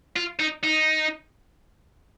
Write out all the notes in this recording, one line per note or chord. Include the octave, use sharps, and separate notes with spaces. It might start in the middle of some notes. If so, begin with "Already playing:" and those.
F4
D#4
D#4